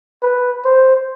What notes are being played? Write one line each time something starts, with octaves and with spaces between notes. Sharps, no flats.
B4
C5